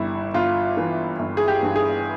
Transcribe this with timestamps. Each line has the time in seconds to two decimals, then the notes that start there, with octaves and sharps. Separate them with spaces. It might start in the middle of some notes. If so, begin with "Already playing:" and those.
Already playing: G1 G3 E4
0.34 G1 F4
0.77 E3
1.19 G1
1.37 G#4
1.48 G4
1.63 G2
1.76 G#4